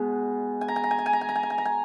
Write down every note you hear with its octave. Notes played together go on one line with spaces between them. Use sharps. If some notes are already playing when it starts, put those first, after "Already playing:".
Already playing: B2 G#3 B3
G#5
A#5
G#5
A#5
G#5
A#5
G#5
A#5
G#5
A#5
G#5
A#5
G#5
A#5
G#5